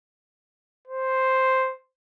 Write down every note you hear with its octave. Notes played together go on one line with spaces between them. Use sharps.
C5